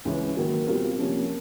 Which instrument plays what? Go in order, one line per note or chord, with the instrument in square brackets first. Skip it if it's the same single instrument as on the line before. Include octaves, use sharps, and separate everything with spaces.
[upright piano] C#2 C#3 E3 G#3 C#4
D#3 F#3 A#3
B2 G3 C4 F4 A#4
C3 F3 A#3 C#4